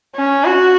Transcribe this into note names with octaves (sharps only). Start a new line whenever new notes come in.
C#4
F#4